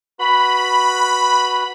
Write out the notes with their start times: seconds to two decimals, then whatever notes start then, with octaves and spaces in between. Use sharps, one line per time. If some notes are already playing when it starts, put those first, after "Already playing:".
0.19 F#4 B4 B5